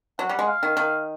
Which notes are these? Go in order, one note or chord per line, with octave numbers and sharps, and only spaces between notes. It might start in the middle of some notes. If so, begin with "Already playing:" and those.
F#3 F#5
G3
G#3
F5
D#3
D#3